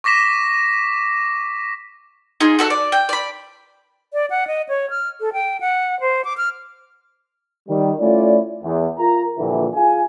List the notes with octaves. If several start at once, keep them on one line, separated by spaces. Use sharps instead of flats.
C#6 D6 A#6 B6 E7
D#4 F4 G#4
F#4 A4 E5 F#5
D5
G5
D5 B5
D5
F#5
D#5
C#5
F6
A4
G5
F#5
C5
D6
F6
D#3 G3
A3 C#4 E4 F4 D5
E2
F4 A#4 A#5
A#1 G2 A#2 D3 E3
F4 G#4 F5 G#5